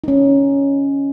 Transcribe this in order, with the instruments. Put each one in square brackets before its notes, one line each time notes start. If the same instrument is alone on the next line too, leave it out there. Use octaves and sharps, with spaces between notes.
[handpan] C#4 D#4